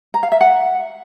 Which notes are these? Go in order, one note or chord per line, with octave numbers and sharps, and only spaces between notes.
A#5
F5
E5
F#5